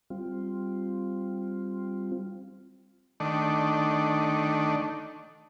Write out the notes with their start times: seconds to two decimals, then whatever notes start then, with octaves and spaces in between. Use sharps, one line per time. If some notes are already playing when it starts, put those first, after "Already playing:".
0.10 G3 C4 F4
3.20 D#3 A3 D4